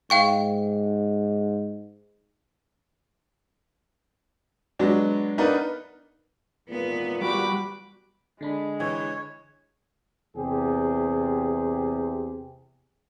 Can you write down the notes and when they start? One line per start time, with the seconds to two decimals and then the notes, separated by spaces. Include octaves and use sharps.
0.10 G#2 F5 G5 C#6
4.79 F#3 G#3 B3 D4 D5
5.38 B3 D4 D#4 A#4 B4 D5
6.68 G#1 E2 A#2 B3
7.21 G3 F#4 B5 D6
8.41 D3 G#3 D4 B5
8.80 E3 C#5
10.35 E2 C3 G4 G#4